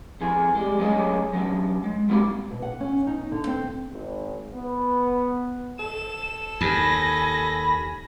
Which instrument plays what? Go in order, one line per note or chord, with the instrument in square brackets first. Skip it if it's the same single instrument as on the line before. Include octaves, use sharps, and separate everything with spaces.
[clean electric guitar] F2 E3 G#4
G3 G#3
F#3 A3 C#4 G#4 C#5 D#5
F#3 C#4 D4
G#3
G3 A#3 C4 E4 F#4 G4
[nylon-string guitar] B2
F#5
C#4
D#4
D3
C4
[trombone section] G#1
B3
[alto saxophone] A4 [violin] E7
[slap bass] D#2 [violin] G#5 A#6 [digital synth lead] B5